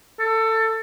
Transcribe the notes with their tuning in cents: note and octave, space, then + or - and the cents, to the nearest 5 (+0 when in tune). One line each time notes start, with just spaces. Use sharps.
A4 +20